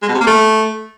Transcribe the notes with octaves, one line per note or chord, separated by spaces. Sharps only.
G#3
B2
C3
A#3
A3